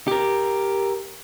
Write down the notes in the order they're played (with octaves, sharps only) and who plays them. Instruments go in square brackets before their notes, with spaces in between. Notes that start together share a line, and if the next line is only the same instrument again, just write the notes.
[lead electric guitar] G4 A#4